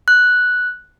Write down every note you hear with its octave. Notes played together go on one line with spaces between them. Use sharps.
F#6